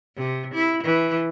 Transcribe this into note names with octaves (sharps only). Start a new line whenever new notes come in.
C3
E4
E3